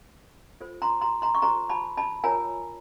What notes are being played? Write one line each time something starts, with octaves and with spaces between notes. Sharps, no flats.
F4 A4 C5
A#5 C6
A#5 C6
A#5 C6
C#6
F4 A4 C5 A#5 C6
A5 B5
A5 B5
F4 A#4 C#5 G#5 A#5